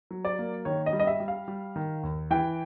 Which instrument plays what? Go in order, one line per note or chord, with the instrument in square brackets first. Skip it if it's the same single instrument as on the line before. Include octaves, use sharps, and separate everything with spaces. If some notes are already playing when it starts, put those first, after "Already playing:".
[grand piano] F#3
[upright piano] D5
[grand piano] A#3
[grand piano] D#3 [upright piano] C#5
[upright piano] D#5
[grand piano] G3
[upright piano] D#5
E5
[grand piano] G3
[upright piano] F5
[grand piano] G3
D#3
D#2
[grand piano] E3 [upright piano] G5